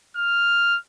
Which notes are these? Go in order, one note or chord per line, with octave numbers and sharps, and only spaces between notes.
F6